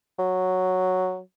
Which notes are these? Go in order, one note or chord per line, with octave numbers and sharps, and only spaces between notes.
F#3